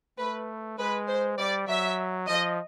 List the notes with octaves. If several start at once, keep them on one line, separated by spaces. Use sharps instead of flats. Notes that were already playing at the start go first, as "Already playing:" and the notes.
A3 B4
G#3 B4
C5
G3 D5
F#3 E5
F3 D#5